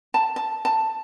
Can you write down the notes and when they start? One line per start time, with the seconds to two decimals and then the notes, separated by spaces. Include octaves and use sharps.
0.14 A5
0.36 A5
0.65 A5